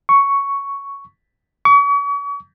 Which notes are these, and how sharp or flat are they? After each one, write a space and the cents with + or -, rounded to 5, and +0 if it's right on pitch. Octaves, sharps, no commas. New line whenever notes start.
C#6 +5
C#6 +40